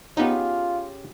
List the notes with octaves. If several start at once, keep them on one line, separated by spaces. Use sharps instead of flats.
B3 C#4 D#4 F4 G4 G#4